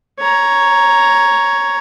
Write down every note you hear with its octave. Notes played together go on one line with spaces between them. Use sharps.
C#5 A#5